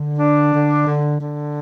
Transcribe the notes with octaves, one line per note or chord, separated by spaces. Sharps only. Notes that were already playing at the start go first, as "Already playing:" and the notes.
Already playing: D3
D4
D3
D3
D3